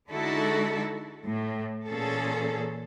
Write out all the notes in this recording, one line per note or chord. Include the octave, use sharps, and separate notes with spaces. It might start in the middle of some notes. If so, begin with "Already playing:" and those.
D3 G#3 D#4 E4 F#4 A4
A2
A#2 E3 C#4 G#4 A4